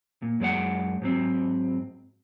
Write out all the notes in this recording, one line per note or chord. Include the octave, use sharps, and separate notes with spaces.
A#2
F#2 G#3 D5 F#5
G#2 F#3 C4